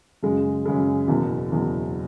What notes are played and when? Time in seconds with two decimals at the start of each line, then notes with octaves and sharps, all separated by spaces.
0.23 F#2 C#3 G#3
0.65 F#2 C#3 G#3
1.08 F#1 E2 B2
1.51 F#1 E2 B2